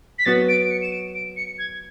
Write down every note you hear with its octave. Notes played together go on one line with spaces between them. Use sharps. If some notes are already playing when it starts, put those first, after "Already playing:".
B6
F#3 B3 F#4 A6
D7
D7
C#7
E7
D7
D7
C#7
G#6